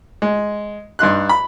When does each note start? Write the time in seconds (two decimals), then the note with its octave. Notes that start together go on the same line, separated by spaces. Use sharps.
0.22 G#3
0.99 G2 D#4 C6 F#6
1.29 B5